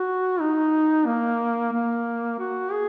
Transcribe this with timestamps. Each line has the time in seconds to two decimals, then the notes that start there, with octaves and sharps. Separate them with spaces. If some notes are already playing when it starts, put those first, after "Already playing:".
Already playing: F#4
0.40 D#4
1.07 A#3
1.73 A#3
2.39 F#4
2.73 G#4